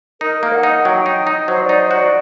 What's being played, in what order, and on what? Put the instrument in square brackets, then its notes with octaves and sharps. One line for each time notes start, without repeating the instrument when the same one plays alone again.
[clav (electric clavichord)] D#4 [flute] A#4
[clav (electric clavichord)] A#3
[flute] F#5
[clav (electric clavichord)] D#4
[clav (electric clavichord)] F#3 [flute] G5
[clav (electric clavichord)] D#4
D#4
[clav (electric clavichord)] F#3 [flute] C5
[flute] D5
[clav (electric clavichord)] D#4
[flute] C5
[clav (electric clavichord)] F#4
[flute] D5